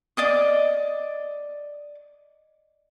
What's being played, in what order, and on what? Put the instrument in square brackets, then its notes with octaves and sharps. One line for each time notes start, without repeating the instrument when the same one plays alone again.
[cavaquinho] D5 D#5 D#6